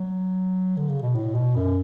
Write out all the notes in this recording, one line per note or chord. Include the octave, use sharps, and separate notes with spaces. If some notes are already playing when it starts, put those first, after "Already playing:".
Already playing: F#3
D3
C#3
B2
A2
B2
F#2